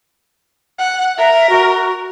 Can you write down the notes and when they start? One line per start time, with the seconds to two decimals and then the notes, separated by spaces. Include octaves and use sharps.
0.79 F#5
1.18 A#4 E5
1.50 F#4